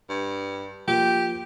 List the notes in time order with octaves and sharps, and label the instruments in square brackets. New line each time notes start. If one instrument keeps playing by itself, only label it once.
[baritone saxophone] G2
[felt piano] F3 A#3 [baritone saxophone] G4